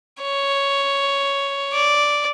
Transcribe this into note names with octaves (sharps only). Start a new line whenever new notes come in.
C#5
D5